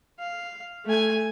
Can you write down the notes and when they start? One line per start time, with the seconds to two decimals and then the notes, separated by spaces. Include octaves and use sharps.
0.19 F5
0.85 A3 G#5